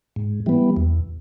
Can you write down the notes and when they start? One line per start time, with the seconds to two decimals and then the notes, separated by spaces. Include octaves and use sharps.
0.16 G#2
0.46 E3 G3 B3
0.76 E2